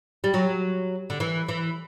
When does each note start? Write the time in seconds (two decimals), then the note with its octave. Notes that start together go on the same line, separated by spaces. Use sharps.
0.24 G3
0.34 F#3
1.10 D3
1.20 E3
1.49 E3